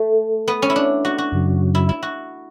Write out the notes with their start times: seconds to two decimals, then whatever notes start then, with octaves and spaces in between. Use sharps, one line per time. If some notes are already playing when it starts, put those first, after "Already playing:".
Already playing: A3
0.48 B3
0.62 C#4
0.70 E4
0.76 D4
1.05 F#4
1.18 F#4
1.32 F#2 C#3 F#3
1.75 E4
1.89 E4
2.03 F#4